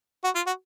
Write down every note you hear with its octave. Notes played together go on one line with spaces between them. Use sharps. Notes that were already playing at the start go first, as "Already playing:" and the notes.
F#4
F4
F#4